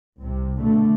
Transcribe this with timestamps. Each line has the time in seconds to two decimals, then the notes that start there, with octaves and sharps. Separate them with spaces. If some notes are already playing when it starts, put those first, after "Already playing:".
0.21 C2 C3
0.61 B2 D3 A3